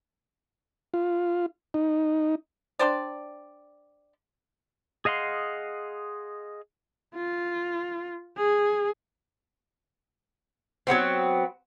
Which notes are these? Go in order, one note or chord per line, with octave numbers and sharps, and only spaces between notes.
F4
D#4
D4 G4 C5 D5
G#4 D#5 F5 F#5 C6
F4
G#4
F#3 G3 B3 C4